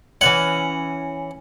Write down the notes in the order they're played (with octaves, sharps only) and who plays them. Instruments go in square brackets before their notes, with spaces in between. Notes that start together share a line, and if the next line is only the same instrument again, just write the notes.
[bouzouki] E3 B3 C#4 [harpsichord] F#5